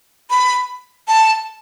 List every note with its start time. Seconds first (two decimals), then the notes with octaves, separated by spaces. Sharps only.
0.30 B5
1.08 A5